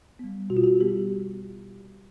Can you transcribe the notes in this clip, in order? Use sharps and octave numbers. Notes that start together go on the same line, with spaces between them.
G3 B3
B2 F#4
F4
F#4
G3 B3 G4